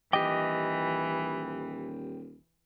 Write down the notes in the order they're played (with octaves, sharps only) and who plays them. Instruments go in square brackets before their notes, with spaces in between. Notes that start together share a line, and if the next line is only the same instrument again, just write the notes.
[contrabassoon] D#1 [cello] E3 [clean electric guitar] G4 G5 [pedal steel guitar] D#5 D6